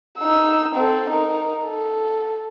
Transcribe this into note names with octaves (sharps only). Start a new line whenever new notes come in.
D#4 E6
C4 A4
D#4 A#4
A4